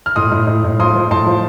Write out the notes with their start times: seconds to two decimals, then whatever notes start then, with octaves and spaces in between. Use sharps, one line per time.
0.06 F6
0.16 A2 C6 D#6
0.31 A2
0.47 A2
0.64 A2
0.80 F3 C6 D#6
0.95 F3
1.11 A2 A5 C6
1.27 F3